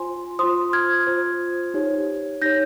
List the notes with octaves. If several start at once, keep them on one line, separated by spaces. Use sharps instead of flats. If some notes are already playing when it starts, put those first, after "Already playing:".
Already playing: F4 C5 G#5 C6
F4 C5 C6 D#6
F6 G#6
F4 C5
D#4 G4 C#5
D#4 G4 C#5 G6 A#6